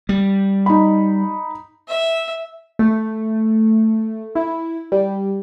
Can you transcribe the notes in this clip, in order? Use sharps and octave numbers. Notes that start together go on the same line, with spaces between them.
G3
D#4 B5
E5
A3
E4
G3